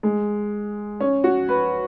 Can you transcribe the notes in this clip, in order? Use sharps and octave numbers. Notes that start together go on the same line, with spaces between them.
G#3
C#4
F#4
B4